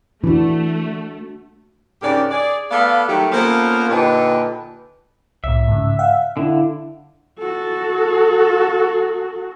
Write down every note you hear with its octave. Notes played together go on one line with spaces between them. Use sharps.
E3 A3 D4 F#4
G#2 C#3 D4 G4 A#4 D5
G#4 D5
A3 B3 B4 D5 F5
D#3 F#3 G3 A3 G4
A#3 B3 C#4 F4 A4 C5
A#2 D3 D#4 G4 A4 B4
C2 A2 E5
G#2 C#3
F5 F#5
D3 E4
F#4 A4